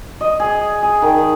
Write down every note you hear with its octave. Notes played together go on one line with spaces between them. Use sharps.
D#5
G#4
G#4
D#3